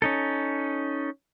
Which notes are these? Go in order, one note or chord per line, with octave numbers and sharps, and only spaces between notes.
C#4 D#4 A4